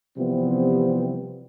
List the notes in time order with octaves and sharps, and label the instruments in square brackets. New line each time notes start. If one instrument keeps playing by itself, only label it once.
[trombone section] C3 E3 F3 G3 B3 C4